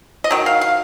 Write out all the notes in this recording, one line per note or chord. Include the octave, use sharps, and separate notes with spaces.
D#5
D#3 F#3
F5
F5